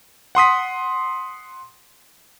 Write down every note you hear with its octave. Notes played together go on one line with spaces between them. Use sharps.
F#5 C6 D#6 B6